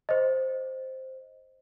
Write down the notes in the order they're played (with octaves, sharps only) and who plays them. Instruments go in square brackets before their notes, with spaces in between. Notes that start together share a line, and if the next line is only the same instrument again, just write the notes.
[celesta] C5 D#5